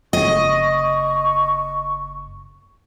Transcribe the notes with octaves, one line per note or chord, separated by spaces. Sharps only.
F#1 D#5 C#6